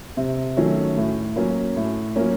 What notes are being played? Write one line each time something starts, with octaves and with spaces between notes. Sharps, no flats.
C3
D#3 F#3 A3 C#4
A2
F#3 A#3 C#4
A2
F#3 A#3 C#4